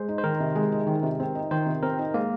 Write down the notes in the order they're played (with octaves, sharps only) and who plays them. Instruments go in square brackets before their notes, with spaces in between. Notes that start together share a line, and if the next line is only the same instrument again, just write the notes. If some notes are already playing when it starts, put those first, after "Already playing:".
Already playing: [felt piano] G#3 [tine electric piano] C5
[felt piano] D#4
[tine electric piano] C5
[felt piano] D#3 [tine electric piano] A#4
[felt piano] C3
G#3
D#4
D#3
C3
C4
D#4
[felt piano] D#3 [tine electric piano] C5
[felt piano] C3
[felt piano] C4 [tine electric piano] A#4
[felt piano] D#4
[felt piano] G#3 [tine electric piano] A#3